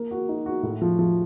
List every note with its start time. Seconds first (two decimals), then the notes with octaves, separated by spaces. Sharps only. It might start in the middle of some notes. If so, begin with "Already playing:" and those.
Already playing: A#3
0.11 F#4
0.29 D#4
0.46 F#4
0.63 A2
0.82 F3
0.99 F3